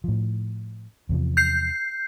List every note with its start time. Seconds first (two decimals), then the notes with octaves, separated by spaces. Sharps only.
0.04 A2 F3
1.09 E2 C3 F3
1.37 G6 C7